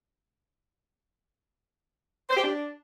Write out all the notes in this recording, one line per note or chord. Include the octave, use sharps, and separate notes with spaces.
C5
G4
D4